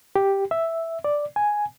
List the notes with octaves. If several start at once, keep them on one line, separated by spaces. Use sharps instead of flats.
G4
E5
D5
G#5